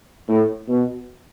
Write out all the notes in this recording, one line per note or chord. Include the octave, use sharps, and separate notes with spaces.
A2
B2